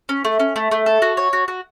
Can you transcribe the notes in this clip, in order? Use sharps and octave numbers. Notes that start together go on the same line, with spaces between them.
C#4
A3
C#4
A3
A3
A4
F#4
C#5
F#4
F#4